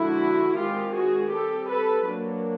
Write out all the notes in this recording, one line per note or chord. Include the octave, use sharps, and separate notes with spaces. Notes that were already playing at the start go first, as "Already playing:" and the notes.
Already playing: D3 F3 G#3 E4 F#4
D#3 G#3 C4 F4 G4
F#4 G#4
G3 C4 G4 A4
A4 B4
F#3 A#3 D4